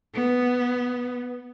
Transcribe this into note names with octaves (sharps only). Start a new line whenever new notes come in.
B3